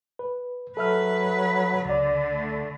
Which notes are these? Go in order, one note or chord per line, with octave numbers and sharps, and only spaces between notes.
B4
F#3 A4 B4 E5 F6
C#2 D3 D5
A3